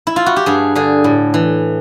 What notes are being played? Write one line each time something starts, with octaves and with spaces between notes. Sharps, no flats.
E4
F4
F#4
G4
G2 G#4
D3 G#4
A2
E3